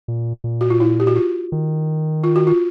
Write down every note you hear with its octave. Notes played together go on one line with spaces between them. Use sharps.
A#2
A#2
F#4
F4
E4
G4
F#4
F4
D#3
F4
F#4
F4